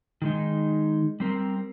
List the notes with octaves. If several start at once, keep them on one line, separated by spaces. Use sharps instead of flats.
D#3 G#3 D#4
G3 C4 A#4